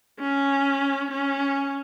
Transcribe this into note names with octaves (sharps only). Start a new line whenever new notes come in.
C#4
C#4